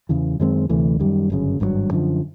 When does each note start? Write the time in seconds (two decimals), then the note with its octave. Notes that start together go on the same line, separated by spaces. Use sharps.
0.09 E2 C#3 E3
0.40 F#2 D#3 G#3 C4
0.69 D2 C3 E3 A3
1.00 F#2 D#3 G3
1.30 G1 F#2 C#3
1.60 G#1 G2 D#3 F#3
1.91 F#2 D3 F3